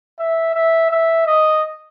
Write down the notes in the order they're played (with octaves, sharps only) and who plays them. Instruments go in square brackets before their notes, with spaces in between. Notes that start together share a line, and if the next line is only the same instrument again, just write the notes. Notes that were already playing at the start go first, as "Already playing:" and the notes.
[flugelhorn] E5
E5
E5
D#5